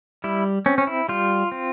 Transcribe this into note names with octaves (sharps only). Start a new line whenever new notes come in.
G3 E4
C4 C#4
C#4
E4
G3 F4
C4